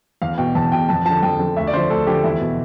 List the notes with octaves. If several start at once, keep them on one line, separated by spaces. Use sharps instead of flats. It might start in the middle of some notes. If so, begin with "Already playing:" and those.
E2 F5
B2 G5
E2 A5
B2 G5
F2 A5
D3 F3 A5
F2 G5
D3 F3
D2 E5
D5
D3 F3 C5
D2 A4
D3 F3 G4
E2 E4
B2